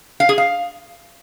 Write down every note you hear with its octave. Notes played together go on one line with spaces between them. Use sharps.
F5
G#4
F5